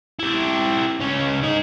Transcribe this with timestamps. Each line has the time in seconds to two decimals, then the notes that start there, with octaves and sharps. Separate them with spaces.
0.19 E4 G4
1.00 C#2 C#4
1.43 D#4 G#4